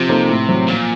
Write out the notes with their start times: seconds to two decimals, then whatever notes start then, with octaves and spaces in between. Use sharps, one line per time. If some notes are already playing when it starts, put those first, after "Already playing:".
Already playing: C3 F3
0.09 A#3 D#4 A4 C5
0.29 A2
0.48 F#3 C4 F#4
0.68 A#2 F3